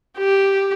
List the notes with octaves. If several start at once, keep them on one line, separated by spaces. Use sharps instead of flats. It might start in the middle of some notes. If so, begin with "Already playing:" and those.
G4